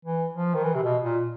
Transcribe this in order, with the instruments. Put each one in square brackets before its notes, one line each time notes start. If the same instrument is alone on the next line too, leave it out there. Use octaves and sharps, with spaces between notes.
[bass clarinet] E3
F3
D#3
E3
C3
B2
A#2